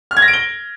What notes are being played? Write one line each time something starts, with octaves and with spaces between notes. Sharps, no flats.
F6
G#6
A#6
D7
G7